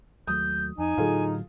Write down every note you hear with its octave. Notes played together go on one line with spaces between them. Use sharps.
D#2 F#3 A3 D#6 G6
F2 D#4 G#5
A2 D3 F#3 F4 G#4 A4